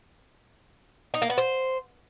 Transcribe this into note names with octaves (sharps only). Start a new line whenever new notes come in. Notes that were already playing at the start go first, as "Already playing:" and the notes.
D#4
A#3
B3
C5